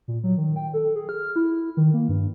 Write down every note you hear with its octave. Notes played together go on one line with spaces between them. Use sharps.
A#2
F#3
D#3
G5
A4
G#4
F6
E4
D#3
A#3
G2